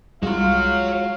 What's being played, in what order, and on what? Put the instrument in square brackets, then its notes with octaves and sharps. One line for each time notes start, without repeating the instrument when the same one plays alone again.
[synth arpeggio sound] C2 [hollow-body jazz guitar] G#3 F4 [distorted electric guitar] F#4 C#5 [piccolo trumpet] F5